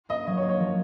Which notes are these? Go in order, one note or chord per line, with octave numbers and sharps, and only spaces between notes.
A#3 D#5
F#3 D#5
C#5
A#3
C#5
F3